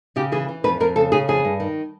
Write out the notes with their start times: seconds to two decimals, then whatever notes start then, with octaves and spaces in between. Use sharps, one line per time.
0.16 C#3 G4
0.32 E3 G#4
0.49 E3
0.64 F2 B4
0.80 F2 A#4
0.96 C#3 A4
1.12 C#3 G#4
1.28 F2 G#4
1.45 G2
1.60 D#3